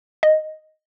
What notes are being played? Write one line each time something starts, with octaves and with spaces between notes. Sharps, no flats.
D#5